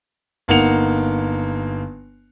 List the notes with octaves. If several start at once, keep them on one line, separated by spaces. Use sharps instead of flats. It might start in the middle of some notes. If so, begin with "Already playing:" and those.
G1 A#3 D#4 F#5 C#7 F7